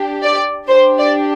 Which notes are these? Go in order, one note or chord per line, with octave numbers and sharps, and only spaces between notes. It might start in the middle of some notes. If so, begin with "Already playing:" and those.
Already playing: D4 G4
D5
D4 G4 C5
D5